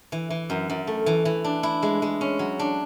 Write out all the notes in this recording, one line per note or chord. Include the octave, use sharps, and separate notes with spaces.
E3
E3
F#2
F#2
A3
E3
E3
D4
E4
G#3
G#3
C#4
F#3
D4